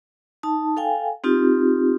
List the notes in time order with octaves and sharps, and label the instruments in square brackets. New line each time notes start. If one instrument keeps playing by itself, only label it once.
[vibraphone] D#4 A5
A4 F5 G5 G#5
C4 D#4 F4 G4